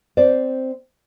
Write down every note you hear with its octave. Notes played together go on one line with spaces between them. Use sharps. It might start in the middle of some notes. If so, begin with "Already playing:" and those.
C4 C5 D5